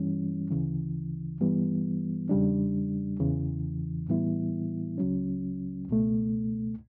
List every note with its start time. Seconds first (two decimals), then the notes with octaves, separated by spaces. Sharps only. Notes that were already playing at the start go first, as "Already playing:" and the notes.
Already playing: G2 E3 G3 C#4
0.51 D2 C#3 E3
1.41 G2 E3 G3 B3
2.29 E2 C#3 G3 D4
3.20 E2 C#3 E3
4.09 A2 E3 G3 B3 E4
4.98 C#2 C#3 F#3 C#4
5.88 C#2 B2 A3